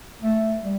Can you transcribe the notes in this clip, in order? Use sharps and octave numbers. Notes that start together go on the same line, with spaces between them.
A3
G3